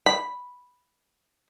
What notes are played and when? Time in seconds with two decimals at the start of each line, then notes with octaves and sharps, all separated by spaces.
0.06 B5